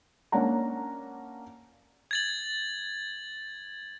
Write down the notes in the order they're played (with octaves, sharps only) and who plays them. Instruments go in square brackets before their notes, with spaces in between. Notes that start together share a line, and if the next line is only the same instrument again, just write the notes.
[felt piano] A#3 C#4 D4 F#5 A#5
[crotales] G#6 A6 F#7